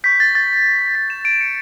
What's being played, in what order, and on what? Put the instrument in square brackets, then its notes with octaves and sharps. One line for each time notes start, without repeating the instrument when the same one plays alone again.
[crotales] C#6 G6 B6
A6
A6
B6
E7
D7
C#7